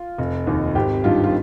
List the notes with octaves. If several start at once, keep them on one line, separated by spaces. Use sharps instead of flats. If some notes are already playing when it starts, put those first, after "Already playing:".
Already playing: F4
F1
D#2 D#3
G#1 G4
G2 D#3 F4
F4